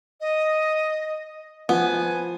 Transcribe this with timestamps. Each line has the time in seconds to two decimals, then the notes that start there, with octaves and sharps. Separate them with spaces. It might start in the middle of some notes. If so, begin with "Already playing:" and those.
0.21 D#5
1.69 F3 B3 G#5